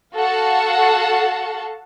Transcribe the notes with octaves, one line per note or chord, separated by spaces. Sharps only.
F#4 A4 F5 F#5 A5